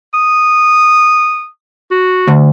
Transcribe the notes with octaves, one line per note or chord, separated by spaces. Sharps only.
D#6
F#4
D2